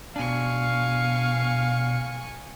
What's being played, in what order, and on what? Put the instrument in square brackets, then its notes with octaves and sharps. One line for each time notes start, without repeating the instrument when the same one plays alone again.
[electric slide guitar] B2 D4 [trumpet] F5 [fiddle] G#5 C#6